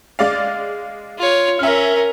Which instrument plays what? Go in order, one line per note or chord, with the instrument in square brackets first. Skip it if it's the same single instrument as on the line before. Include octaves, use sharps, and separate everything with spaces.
[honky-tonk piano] G#3 D5 F5
[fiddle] F4 C#5
[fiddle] C#4 A#4 [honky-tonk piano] E5 F6